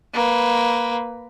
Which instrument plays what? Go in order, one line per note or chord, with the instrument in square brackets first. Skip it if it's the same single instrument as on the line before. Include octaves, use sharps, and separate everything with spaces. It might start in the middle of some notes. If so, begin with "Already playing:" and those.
[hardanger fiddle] A#3 B4